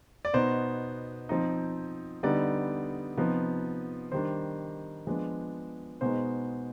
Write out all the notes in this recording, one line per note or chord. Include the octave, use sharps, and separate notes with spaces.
D5
B2 B3 D#4 C5
F3 C4 D#4
D3 G3 B3 D#4 D5
C3 F3 B3 D#4
D#3 G3 D4 C5
F3 G#3 B3 D4
B2 G#3 B3 D#4 C5